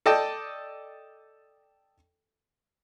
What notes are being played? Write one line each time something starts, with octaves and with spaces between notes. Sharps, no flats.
A4 D5 D#5 G5 A5